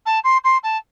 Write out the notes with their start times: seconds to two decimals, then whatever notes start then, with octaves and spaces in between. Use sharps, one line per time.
0.06 A5
0.24 C6
0.44 C6
0.63 A5